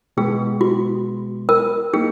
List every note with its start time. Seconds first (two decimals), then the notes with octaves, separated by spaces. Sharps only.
0.17 B2 G#3 B3 G#4
0.61 F#4
1.49 A#4
1.93 A#3 D#4 G#4